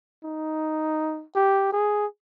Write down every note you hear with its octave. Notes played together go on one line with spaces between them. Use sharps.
D#4
G4
G#4